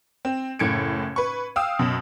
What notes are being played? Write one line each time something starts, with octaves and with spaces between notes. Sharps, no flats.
C4
F#1 A2 G#6 C#7 D7
B4 C#6
F5 G5 D#6 E6
F#2 B2